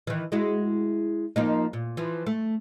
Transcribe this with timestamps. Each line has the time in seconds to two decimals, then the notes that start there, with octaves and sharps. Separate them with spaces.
0.07 D#3 E3
0.32 G#3 E4 F#4
1.36 F3 A#3 D#4
1.73 A#2
1.97 E3 F3
2.26 A3